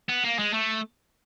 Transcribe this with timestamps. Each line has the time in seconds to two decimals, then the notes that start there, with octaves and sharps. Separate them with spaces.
0.09 B3
0.24 A#3
0.39 G#3
0.53 A3